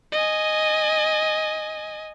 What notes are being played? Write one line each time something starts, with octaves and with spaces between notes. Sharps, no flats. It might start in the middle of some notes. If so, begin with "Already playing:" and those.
D#5 G#5